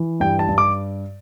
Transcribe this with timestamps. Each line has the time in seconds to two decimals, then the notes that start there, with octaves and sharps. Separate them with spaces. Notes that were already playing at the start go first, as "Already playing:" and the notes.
Already playing: E3
0.20 G2 G5
0.39 A5
0.49 G2
0.58 D6